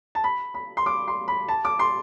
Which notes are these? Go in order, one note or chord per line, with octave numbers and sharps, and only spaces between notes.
A5
B5
B5
C6
D6
C6
B5
A5
D6
C6